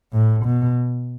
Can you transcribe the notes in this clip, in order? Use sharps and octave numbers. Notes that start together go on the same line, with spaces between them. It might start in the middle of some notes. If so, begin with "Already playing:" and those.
A2
B2